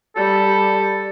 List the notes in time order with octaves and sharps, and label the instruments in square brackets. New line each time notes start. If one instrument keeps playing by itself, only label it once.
[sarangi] G3 [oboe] A4